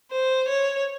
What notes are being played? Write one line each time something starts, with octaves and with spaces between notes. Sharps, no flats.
C5
C#5